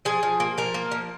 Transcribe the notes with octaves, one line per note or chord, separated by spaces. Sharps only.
F3 G#4
F3
A#3
F3 A#4
A#3
F3